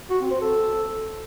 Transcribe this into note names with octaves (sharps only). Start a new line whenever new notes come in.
F#4
C4
C5
A4